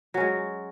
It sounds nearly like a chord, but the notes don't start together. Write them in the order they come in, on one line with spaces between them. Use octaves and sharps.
F#3 C#4 G#3